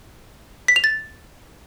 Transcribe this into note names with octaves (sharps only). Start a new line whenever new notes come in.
B6
F7
A6